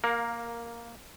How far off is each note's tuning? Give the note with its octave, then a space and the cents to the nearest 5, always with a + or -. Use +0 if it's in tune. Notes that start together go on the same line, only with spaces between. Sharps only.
A#3 +5 A#4 +0 F5 +30